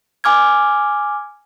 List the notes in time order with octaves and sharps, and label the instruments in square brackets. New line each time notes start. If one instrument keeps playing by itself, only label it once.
[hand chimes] G#5 D6 F6 G#6